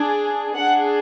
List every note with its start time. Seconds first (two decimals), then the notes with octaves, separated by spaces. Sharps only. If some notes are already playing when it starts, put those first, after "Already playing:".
Already playing: D4 G#4
0.55 D4 G#4 F#5